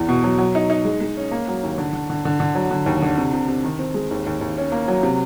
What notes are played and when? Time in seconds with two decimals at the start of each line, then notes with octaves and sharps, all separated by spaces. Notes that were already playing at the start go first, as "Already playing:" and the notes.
Already playing: E2
0.09 B2
0.24 F#3
0.38 F#3
0.55 D#4
0.70 D#4
0.85 G#3
1.01 G#3
1.17 C#4
1.31 A#3
1.48 F#3
1.63 D#2
1.78 D3
1.93 D3
2.10 D3
2.25 D3
2.40 D3
2.55 F#3
2.71 D3
2.86 D#2
3.02 D3
3.18 C3
3.33 C3
3.48 C3
3.64 D#3
3.79 C4
3.94 G#3
4.11 D#2
4.26 D#2
4.41 D#2
4.57 C#4
4.72 A#3
4.88 F#3
5.03 C3